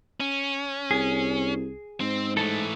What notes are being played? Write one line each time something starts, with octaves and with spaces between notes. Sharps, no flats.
C#4
C2 G#4
G#2 C4
E3 A3 A4